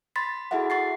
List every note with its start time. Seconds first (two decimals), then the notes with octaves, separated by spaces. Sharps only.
0.16 B5 C6 A6 B6
0.51 E4 F#4 G#4 A4 E5 F#5
0.70 F#5 C#6 A6 C7